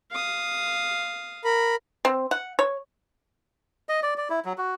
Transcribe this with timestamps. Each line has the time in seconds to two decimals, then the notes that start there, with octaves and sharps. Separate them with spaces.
0.11 F5 D#6
1.45 A#4 B5
2.05 C4
2.31 F#5
2.59 C#5
3.89 D#5
4.03 D5
4.18 D5
4.30 E4
4.45 F#3
4.58 F#4